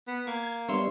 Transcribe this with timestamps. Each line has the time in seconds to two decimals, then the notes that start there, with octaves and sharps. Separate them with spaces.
0.08 B3
0.27 A#3 G#6
0.69 G3 B3 D4 C#5 E5 C6